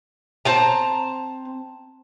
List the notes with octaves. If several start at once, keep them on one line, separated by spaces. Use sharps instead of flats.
C4 A5 A#5